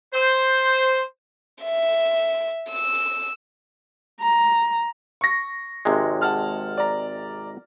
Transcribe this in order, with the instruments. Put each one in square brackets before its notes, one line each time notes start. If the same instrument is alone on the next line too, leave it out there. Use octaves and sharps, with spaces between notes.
[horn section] C5
[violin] E5
E6
[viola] A#5
[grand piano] C#6 A#6
[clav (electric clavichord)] G#1 C3 G#3
[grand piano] F#5 A5 F6
D5 A#5